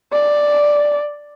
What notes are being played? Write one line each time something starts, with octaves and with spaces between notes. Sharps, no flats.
D5